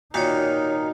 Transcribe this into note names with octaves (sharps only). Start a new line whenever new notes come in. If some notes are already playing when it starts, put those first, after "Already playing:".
A#2 D#3 D#4 F#4 C#5